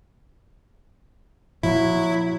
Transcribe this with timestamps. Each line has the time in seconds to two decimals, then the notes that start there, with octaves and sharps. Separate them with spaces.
1.63 A#2 F3 F#3 E4